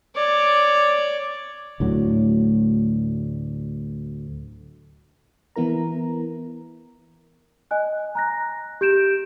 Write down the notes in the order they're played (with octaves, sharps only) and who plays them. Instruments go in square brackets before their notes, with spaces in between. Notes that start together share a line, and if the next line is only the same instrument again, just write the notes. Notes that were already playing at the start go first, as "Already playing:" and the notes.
[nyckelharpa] C#5 D5
[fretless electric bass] D2 A2 F#3
[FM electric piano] E3 B3 E4 A#4 A#5
[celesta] D#5 G#5 F#6
A#5 F#6 A#6
G4 G6 D7 E7